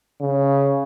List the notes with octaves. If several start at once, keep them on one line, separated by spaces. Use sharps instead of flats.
C#3